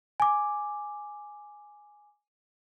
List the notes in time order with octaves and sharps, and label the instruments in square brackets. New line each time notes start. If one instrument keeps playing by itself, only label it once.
[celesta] G#5 D6